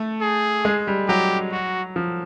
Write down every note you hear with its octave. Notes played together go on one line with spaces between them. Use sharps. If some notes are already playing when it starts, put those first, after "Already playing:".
Already playing: A3
G#4
G#3
G3
F#3 G4
F#4
F3